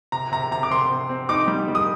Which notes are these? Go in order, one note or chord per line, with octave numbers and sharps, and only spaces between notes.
C3 A#5
C3 A#5
C3 A#5
D6
C3 C6
C4
C4
D#4 D6
G3
G3
D#6